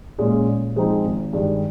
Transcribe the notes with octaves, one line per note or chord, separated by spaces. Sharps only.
A#2 G#3 C#4
A#2
F3 G#3 C4 D#4
G#1
G2 D#3 G#3